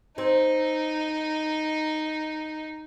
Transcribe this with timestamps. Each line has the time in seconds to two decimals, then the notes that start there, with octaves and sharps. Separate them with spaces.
0.18 C4 D#4